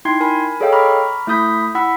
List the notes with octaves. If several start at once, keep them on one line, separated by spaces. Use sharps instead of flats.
D#4 E4 G5 C6 G#6 C7
A#4 G#5 B5
G#4 A4 C#5 D#5 F5 G5
A#5 B5 C#6 D6 F6
A3 E4 B5 D#6 G6 B6
E4 F#5 B5 E6 B6